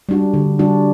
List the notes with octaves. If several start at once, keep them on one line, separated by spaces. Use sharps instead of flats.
G3 D4 F#4
D3
G3 D4 F#4